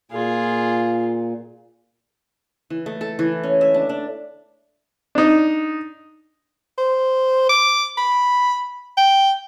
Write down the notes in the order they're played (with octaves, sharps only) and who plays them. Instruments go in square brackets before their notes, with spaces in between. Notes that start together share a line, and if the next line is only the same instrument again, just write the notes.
[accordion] A#2 [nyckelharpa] F4 G#4
[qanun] E3
A3
A4
E3
C#4
E5
D4
D4
[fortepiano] D4 D#4
[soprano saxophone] C5
D6
B5
G5